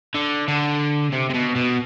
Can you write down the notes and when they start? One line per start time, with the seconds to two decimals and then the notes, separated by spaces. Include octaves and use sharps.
0.15 D3
0.48 D3
1.12 C3
1.30 C3
1.34 B2
1.56 B2